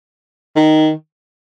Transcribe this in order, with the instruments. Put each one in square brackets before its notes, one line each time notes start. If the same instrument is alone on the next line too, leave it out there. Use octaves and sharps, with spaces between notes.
[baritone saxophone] D#3